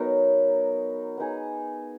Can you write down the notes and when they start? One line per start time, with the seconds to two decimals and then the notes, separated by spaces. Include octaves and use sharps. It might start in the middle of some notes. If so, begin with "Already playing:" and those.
Already playing: F#3 B3 D#4 A#4
1.17 B3 D#4 G#4